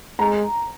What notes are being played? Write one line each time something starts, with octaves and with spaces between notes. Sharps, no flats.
G#3 A#5